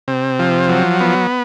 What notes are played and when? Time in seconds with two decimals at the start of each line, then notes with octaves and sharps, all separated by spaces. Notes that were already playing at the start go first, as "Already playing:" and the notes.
0.08 C3
0.39 F3
0.69 F#3
1.00 B3